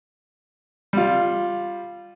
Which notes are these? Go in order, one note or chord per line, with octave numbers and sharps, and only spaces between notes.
G3 F4